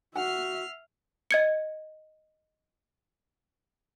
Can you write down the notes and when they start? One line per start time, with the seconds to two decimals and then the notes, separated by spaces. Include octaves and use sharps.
0.16 F#4 E5 F#5 F6 C7
1.31 D#5 G#6 C#7